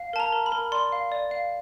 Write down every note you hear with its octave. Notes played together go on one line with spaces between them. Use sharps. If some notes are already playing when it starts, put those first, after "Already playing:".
Already playing: F5
A#4 A5
A#5
A#4
B5
A#4
D5 C6
F5
D5
F5